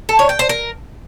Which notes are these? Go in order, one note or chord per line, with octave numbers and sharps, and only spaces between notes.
A4
C#5
G5
C5
A#4